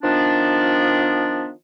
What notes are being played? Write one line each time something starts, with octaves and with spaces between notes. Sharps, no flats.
D#3 F3 B3 D4